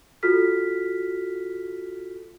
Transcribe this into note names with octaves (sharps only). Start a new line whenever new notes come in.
F4 F#4 A4 F6 B6